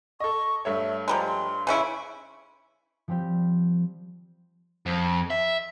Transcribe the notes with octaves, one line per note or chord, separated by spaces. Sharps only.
A4 D#5 C#6
G2 A3 C#5 E5
F3 G3 G#3 A#5
C6
C#3 C#4 E4 B5 C6 D7
F3 G3 C4 G4
F2
E5